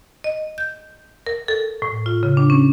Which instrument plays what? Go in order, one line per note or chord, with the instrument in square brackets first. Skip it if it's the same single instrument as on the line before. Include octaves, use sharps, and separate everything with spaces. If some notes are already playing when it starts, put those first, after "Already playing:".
[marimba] D#5
G6
A#4
A4
A2
F4
C#3
D4
C#4